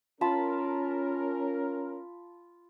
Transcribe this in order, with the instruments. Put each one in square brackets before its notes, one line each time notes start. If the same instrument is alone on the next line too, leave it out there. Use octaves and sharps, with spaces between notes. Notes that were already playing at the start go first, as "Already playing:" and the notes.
[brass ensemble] C#4 A#4 [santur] F4 A5 B5